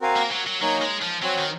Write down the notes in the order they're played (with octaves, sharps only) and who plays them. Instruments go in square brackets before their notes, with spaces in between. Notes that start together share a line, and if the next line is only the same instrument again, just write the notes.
[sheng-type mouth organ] C4 F#4 A#4 F5 G#5
[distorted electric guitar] A#3
F#3
F#3
[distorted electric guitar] F#3 [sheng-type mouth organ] A#3 D#4 A#4 C#5 G#5
[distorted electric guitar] G#3
F3
[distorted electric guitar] F#3 [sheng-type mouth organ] C4 F#4 C#5 G#5
[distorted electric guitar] D#3